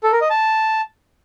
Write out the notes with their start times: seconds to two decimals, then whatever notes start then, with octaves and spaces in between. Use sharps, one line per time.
0.03 A4
0.12 A#4
0.21 D#5
0.30 A5